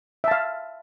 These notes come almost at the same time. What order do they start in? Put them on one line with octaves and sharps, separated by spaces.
E5 A5 F5